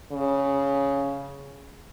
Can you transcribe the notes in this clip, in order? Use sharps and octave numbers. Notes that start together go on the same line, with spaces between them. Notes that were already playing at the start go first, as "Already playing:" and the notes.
C#3